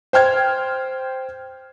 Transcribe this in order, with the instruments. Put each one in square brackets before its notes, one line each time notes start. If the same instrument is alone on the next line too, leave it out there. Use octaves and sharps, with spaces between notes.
[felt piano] C5 G5 F6 G#6